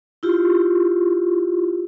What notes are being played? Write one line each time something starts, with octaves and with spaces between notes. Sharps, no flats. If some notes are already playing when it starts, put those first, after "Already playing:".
E4 F4 G4